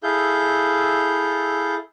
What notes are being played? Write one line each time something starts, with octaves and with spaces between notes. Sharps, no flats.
E4 G#4 A4 F5 G6